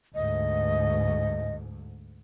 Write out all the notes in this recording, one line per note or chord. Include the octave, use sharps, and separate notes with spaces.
D2 G#2 D#5